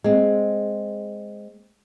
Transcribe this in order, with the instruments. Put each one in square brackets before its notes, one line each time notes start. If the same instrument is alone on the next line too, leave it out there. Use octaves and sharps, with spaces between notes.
[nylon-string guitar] G#3 C4